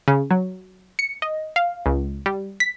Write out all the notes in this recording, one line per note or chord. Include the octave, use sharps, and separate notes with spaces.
C#3
F#3
C#7
D#5
F5
C#2
G3
B6